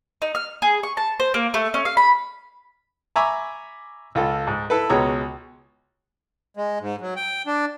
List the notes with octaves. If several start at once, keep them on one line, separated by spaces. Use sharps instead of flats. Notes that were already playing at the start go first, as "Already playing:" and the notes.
D#4
F6
G#4
C#6
A5
C5
A#3
A3
C#4
F5
B5
E5 G#5 A#5 B5 C#6 D6
C#2 F4 A4
G#2
E4 A4 B4
C#2 B2 G#3 C#5 A#5 D#6
G#3
G#2
F#3
G5
D4